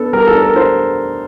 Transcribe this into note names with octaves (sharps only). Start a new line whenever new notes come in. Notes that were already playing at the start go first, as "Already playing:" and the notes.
Already playing: B3 D4 A4
G3 A#4
A4
D4
A#4
D4 C5